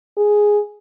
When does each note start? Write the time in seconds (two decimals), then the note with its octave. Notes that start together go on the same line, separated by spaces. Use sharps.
0.17 G#4